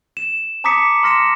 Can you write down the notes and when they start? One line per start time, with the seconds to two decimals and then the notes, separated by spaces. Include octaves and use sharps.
0.17 E7
0.64 A5 A#5 D6 D#6 B6 C#7
1.03 C6 F6 A#6 C#7 E7